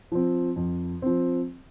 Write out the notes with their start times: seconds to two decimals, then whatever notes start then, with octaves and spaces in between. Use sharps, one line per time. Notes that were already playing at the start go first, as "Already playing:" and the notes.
0.12 F3 C4
0.56 F2
1.02 F3 C4